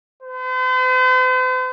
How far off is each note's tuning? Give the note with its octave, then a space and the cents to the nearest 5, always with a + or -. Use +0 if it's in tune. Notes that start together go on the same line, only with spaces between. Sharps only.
C5 -45